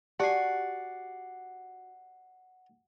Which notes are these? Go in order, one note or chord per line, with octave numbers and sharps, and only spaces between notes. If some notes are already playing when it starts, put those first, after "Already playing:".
F#4 G4 D5 F#5 G#5 A5 C7